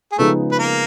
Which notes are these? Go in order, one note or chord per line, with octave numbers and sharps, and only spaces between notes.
G#4
C#3 F3 G#3 A3 B3 D#4 A4
B4
A#3 A#4